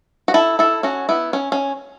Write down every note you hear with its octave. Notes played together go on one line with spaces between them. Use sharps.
F#4
E4 A4
E4 A4
C#4 F#4
B3 E4
C#4
C#4